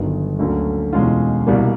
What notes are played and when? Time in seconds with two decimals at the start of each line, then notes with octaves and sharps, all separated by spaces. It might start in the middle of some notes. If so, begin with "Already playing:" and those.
Already playing: G1 G2 D#3 F#3 B3
0.39 D2 D3 F#3 A#3 C#4
0.93 E2 B2 G#3 C#4 F4
1.47 C2 B2 G3 A#3